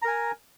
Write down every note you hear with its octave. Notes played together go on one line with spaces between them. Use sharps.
A#4 G#5 A#5